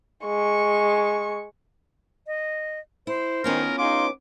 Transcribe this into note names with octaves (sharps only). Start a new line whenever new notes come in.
G#3 C#6
D#5
E4 C5
D#3 B3 C#4 F4 A#4
D#4 G#4 F5 C6 D6